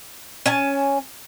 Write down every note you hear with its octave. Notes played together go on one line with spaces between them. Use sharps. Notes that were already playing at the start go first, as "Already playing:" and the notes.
C#4 G#5 A5